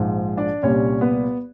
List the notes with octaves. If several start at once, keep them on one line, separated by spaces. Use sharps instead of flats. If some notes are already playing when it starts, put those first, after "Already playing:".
Already playing: A#1 G#2 F3
D4 D5
C2 A#2 G3 C#4 C#5
B3 B4